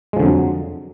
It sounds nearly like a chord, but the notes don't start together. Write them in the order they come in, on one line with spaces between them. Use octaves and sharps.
G#3 F3 D3 F2 F#3